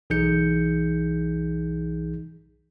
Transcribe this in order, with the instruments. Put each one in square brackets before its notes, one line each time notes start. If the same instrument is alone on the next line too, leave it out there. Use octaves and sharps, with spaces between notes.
[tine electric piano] B1 E3 D#4 G#4 G6 C#7